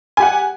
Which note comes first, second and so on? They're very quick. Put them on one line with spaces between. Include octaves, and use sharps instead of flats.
G#5 G4 F#5